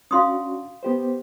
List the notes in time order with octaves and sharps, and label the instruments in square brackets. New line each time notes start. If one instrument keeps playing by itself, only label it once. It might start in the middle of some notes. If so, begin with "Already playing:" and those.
[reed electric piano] C#4 D4 F#4 [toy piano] F5 C6 D#6
[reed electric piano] B3 G4 C5